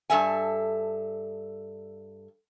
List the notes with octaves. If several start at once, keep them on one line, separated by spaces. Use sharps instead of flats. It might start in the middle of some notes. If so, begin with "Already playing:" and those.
G2 D#3 A4 E5 G#5